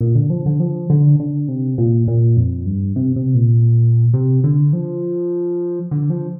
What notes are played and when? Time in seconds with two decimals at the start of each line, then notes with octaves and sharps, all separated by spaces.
0.01 A#2
0.15 D3
0.30 F3
0.46 D3
0.60 F3
0.90 D3
1.20 D3
1.48 C3
1.78 A#2
2.08 A#2
2.37 F2
2.66 G2
2.96 C3
3.16 C3
3.35 A#2
4.14 C3
4.44 D3
4.73 F3
5.91 D3
6.10 F3